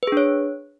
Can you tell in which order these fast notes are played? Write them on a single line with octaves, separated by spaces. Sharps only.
B4 G#4 D4 C#5